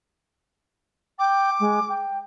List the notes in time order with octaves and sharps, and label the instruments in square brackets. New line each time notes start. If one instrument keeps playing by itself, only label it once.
[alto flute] G5 [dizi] D6
[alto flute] G#3
G5